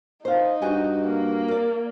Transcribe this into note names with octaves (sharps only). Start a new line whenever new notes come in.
D#4 C5 F5
G2 F#4 G5 G#5
A#3
A#4 D5